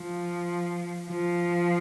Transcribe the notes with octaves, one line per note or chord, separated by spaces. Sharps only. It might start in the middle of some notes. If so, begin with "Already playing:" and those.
Already playing: F3
F3